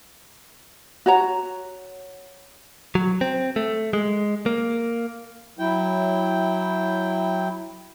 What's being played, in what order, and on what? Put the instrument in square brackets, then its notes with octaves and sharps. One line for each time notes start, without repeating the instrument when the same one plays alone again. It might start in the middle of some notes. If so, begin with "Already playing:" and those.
[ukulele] F#4 C#5 A#5
[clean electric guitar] F#3
C4
A3
G#3
A#3
[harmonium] F#3 E4 G5